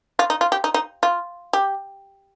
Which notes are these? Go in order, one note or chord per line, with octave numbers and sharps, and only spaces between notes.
F4
D#4
F4
G4
D#4
D#4
F4
G4